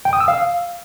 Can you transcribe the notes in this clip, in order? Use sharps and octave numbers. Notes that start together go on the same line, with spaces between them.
G5
D#6
E6
F5